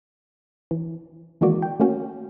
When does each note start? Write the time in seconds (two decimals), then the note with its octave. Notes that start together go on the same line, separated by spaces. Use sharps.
0.71 E3
1.41 D#3 E3 G#3 A#3 F#4 D5
1.62 G5
1.80 A3 A#3 C#4 F#4